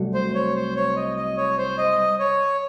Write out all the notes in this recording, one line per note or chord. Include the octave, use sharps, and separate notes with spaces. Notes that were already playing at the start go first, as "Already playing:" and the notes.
Already playing: C2 C3 F#3 A3
C5
C#5
C5
C#5
D#5
D#5
C#5
C5
D#5
C#5